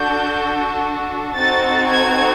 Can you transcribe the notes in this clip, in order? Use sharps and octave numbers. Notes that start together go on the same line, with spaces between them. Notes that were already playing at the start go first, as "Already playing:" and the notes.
Already playing: D4 F#4 A4 G6
C4 D#4 F#4 A4 A6
G#6